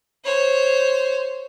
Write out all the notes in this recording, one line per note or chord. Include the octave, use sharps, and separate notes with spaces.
C5 C#5